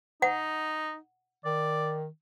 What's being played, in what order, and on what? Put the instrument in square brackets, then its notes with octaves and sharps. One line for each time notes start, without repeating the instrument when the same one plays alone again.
[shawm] D#4 [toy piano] F#5
[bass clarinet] D#3 [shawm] D5